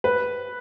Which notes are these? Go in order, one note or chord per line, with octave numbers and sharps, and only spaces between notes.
B4